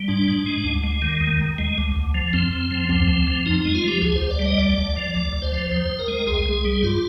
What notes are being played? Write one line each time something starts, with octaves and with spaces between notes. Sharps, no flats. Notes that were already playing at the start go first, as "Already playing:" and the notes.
Already playing: G3
G#2 D4
G#2
G#3
D2
G#3
D#3
D#2
D#2
G#3
D2
D2
F3
F2 C4
F2
F3
D2 C4
D2
F3
F2 D#4
D#4
G#3
F4
F3 G4
D2 G#4
C5
D2
D5
G3
D#5
D2 D5
D2
F3
D2 D5
D2
C5
F3
D#2 C5
D#2
A#4
G#3
C2 G#4
C2
G3
G2 F4